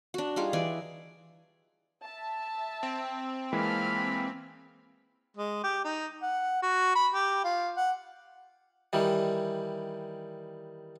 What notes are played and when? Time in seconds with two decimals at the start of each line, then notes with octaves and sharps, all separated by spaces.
0.14 D4 F#4
0.36 G3 D#4 F4 G#4
0.53 E3 D5 D#5 G#5
2.05 E5 A5
2.83 C4
3.53 E3 G#3 A#3 F4 A5 B5 F6
5.37 G#3
5.63 G4
5.84 D#4
6.22 F#5
6.62 F#4
6.95 B5
7.14 G4
7.44 F4
7.77 F#5
8.93 D#3 E3 G3